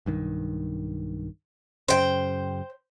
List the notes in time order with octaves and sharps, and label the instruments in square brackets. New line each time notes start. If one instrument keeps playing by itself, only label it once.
[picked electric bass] B1 G2 D#3
[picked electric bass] F#2 C#3 [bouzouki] C5 G5